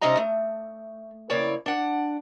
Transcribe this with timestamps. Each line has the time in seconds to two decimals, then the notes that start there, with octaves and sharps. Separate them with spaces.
0.01 C3 G3 C#4 D#4 D#5 A#5
0.17 A3
1.30 F2 C#3 A#3 E4 C#5 D5
1.66 D4 F#5